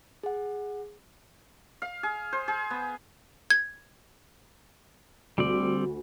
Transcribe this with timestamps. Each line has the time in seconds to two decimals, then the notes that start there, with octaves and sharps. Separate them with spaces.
0.23 G#4 F#5
1.82 F5
2.03 G#4
2.33 C5
2.48 G#4
2.70 B3
3.50 G#6
5.38 D2 G3 C4 D5